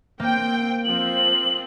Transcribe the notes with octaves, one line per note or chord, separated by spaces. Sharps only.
A#3 C4 G5
F3 C4 F#7